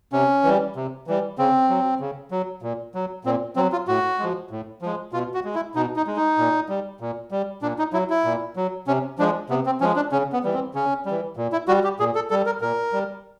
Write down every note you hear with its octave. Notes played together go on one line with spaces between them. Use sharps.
C3 C#4
E3 G3
C3
E3 G3
C#3 C4
F#3
C#3
F#3
A#2
F#3
A#2 C4
F#3 C4
F4
A2 F#4
F3 G#3
A2
F3 G#3
B2 F4
F#4
G#3
E4
B2 D#4
D#4
G#3
D#4
A#2
G3
A#2
G3
A#2 D4
D#4
F#3 E4
E4
A#2
F#3
C3 C#4
F3 G#3 D4
C3 B3
C4
F3 G#3 C#4
D4
C#3 C#4
B3
E3 G3
C4
C#3 C#4
G3
E3
A#2
E4
G3 F#4
G4
A#2 G#4
A4
G3 A4
A#4
A#2 A#4
G3